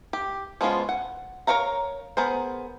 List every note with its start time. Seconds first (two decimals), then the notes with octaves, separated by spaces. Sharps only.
0.13 G4
0.61 F3 G#3 B3 C#4 F4
0.89 F#5
1.47 A#4 B4 C#5 F5 A#5
2.17 B3 G#4 A#4 C5